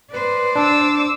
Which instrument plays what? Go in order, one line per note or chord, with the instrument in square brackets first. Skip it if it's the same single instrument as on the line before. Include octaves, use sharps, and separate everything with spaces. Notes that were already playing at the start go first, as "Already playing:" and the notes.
[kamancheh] B4 [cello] C5 D5
[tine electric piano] D4 [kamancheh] D6 E6